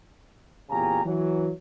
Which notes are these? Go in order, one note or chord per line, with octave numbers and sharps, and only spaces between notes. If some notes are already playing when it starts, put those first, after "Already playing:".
E2 A#2 C#3 G4 G#5 A#5
E3 F#3